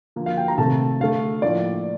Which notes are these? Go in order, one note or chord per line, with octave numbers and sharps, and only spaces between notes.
D3 F3 A#3
F5
G5
A#5
C3 D#3 A3 A5
D3 A3 F5
A2 F3 A#3 D5